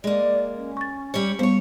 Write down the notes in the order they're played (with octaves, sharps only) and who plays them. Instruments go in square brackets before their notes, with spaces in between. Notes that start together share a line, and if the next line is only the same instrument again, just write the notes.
[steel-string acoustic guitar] G#3 A#3 [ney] D5
[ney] C#4
[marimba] C#6 A6
[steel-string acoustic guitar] G3 C#5
[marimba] G3 B3 [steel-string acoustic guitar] C5 C#5